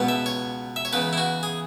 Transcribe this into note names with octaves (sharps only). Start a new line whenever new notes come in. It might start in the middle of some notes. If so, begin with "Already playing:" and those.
Already playing: C#2 B2 B3
E5
C#5
E5
C#5
E2 C#3 E3 B4
E4
F#4
G#4